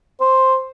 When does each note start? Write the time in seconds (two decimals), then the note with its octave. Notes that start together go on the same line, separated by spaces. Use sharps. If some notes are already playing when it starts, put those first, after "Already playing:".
0.21 C5